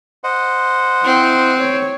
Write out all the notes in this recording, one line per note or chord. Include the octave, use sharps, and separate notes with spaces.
C5 D#5 F#5
C4 E4
C#5